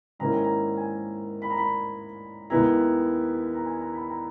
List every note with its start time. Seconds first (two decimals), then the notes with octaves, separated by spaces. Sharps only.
0.19 G#2 D#3 A#3 C#4 E4 A#5
0.32 G#5
0.44 A#5
0.77 G#5
1.42 B5
1.50 A#5
1.57 B5
2.50 D#2 D#3 G#3 B3 E4 A#5
3.54 A#5
3.66 G#5
3.79 A#5
3.94 B5
4.09 A#5